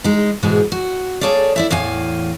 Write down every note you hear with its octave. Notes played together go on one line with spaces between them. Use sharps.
G#3 D#4
G#2 B2 E3 G#3
F#4
A#3 G#4 A4 C#5 D5
E4 D5 E5
E2 A2 F5 G#5